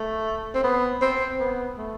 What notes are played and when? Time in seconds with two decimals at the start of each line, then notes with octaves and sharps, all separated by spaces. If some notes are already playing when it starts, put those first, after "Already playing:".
Already playing: A3
0.55 C4
0.64 B3
1.01 C4
1.39 B3
1.78 A3